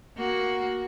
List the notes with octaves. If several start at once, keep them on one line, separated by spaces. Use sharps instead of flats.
A#3 F#4